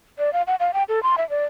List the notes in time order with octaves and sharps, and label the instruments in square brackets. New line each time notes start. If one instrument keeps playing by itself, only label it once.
[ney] D5
F5
F#5
F5
G5
A4
C6
E5
D5